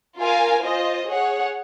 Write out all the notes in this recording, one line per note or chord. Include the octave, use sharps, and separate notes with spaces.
F4 A#4 F5 G#5
F4 C5 D#5
G#4 C#5 F#5